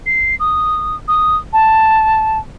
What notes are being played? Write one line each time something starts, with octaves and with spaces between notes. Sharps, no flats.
C7
D#6
D#6
A5